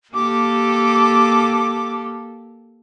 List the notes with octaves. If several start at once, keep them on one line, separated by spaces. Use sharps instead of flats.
A#3 G4 A4 D6